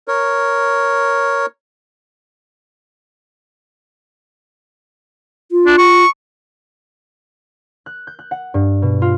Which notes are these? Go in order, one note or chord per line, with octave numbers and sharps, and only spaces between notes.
A#4 C#5
F4
D4
C#6
F#6
G6
F#6
F#5
G2
B2
F4